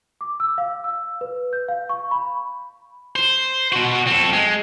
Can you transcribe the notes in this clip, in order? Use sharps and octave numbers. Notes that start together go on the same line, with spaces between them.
D6
E6
F5
E6
B4
G6
F5
C#6
B5
C5
B2 F#4
C4 A4
G#3